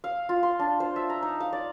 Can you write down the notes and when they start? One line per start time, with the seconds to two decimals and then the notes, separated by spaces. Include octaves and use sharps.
0.04 F5
0.29 F4
0.43 C6
0.59 D4
0.80 C5
0.96 E5
1.10 A#5
1.23 D#4
1.40 F5
1.53 D5